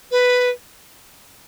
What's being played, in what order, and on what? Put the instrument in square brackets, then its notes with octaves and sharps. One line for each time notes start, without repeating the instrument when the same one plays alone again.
[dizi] B4